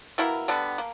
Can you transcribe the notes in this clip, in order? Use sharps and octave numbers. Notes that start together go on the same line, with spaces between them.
B2 A#3 E4 A#4
D3 G3 B3
A#3